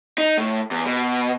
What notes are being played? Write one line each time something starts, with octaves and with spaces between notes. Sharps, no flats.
D#4
A2
E2
B2